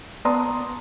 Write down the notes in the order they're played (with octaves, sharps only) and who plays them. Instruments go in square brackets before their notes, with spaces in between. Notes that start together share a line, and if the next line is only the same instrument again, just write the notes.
[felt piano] B3 D5 A5 A#5 C6 D#6